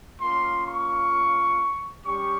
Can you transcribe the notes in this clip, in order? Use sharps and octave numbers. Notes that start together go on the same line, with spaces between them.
A#3 C#4 F4 C6
C#6
G3 C#4 G4 C#6